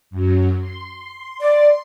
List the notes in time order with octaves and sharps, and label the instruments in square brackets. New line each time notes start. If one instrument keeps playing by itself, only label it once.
[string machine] F#2 F#3
C6
[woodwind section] D5